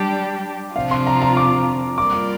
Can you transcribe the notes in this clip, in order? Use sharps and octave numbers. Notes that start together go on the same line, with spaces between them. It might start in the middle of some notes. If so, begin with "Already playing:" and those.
Already playing: G3 D4 G4 D5
C3 F3 D4 F4 F5
C6
A#5
A#5
D6
G3 A#3 F4 A#4 D5 D6